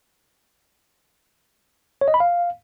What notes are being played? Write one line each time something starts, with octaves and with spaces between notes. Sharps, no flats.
C#5
D#5
B5
F5